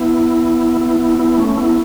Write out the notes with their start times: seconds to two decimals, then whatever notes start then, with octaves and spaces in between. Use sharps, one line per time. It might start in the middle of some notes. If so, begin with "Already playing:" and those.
Already playing: B3 E4
0.81 B3 E4
1.00 B3 E4
1.19 B3 E4
1.38 A3 C#4
1.57 B3 E4